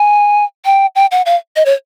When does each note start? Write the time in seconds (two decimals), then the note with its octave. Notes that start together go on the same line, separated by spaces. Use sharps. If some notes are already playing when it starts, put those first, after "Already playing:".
Already playing: G#5
0.65 G5
0.96 G5
1.11 F#5
1.26 F5
1.56 D#5
1.65 C#5